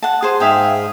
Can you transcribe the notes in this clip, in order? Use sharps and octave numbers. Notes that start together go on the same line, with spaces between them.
F#5 A5
G#4 C5
G#2 G#4 E5 F5 G5